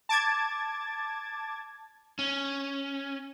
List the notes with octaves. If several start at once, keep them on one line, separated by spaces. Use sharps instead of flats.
A5 D6 G#6 A6
C#4